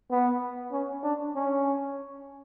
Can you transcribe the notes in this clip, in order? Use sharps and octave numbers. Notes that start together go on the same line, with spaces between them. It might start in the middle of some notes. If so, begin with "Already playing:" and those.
B3
C#4
D4
C#4